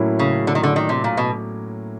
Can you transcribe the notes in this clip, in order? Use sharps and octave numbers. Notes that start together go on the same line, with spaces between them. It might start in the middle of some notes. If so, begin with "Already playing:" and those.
Already playing: A2 F#3 A#3 C#4 E4
C#3
D3
D#3
D3
D#3
C3
A#2
B2